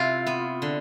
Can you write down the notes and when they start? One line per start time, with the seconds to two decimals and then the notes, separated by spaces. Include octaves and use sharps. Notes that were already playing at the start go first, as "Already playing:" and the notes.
Already playing: C3 E4 F4
0.27 B3
0.62 D3